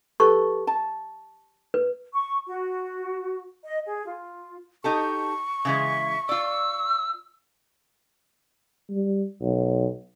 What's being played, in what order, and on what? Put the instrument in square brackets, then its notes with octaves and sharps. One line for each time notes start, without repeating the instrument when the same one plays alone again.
[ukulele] G4 A4 B4 [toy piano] C#6
[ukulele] A5
[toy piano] B4
[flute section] C#6
F#4
D#5
G#4
F4
[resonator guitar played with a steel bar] D#4 G4 A4 [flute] C#6
[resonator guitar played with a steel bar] C#3 E3 G#3 [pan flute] E5
[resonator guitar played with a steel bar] F4 D5 [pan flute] E6
[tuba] G3
B1